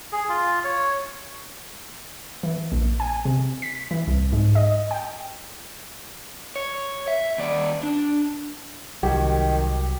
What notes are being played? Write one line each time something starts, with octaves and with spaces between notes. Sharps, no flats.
G#4
F4
C#5
E3
A#1
G#5
C3
B6
E3
C2
G#2
D#5
G5
C#5
E5
D#2 D5
D4
C2 D#3 F#3 G4